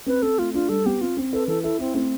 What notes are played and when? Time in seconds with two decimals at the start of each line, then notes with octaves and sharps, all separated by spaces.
0.06 C4 B4
0.22 C4 A4
0.38 A3 F4
0.54 D4 F4
0.69 G3 A4
0.86 B3 G4
1.01 C4 F4
1.17 C4
1.33 A4 B4
1.48 E3 A4
1.63 E4 A4
1.79 C4 E4
1.94 A3 C4